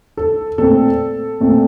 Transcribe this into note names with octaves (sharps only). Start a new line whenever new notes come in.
A4
A#2 A3 C4 A4
A#2 A3 C4